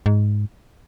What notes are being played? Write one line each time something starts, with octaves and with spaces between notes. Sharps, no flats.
G#2